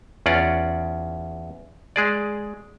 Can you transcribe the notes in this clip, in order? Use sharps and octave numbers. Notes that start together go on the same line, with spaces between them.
E2 C#4 F4 D5 F#5
G#3 G#4 D5